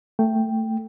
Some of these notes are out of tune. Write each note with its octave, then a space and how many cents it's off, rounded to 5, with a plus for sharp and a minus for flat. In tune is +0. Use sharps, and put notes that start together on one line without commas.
A3 +15 G5 +0